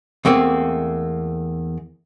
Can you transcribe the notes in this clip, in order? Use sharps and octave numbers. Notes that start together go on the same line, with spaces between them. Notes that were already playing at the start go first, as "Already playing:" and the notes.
E2 A3 A#3 C4